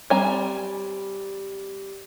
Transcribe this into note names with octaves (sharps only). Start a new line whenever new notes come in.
G3 C4 G#5 A#5